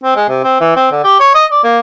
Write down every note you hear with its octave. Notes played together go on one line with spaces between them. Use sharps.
C4
G#3
C3
C4
E3
C4
D3
G4
C#5
D#5
D5
A#3